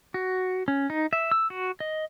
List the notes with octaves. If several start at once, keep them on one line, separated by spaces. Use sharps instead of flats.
F#4
C#4
D#4
E5
E6
F#4
D#5